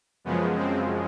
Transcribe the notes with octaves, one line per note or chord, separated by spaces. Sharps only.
F#2 C#3 F3 G#3 B3
C4